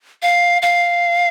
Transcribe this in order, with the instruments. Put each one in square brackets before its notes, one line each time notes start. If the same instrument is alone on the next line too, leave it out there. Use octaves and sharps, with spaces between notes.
[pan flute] F5
F5